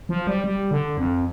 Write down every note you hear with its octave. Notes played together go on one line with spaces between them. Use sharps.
F3
G3
G3
D3
F2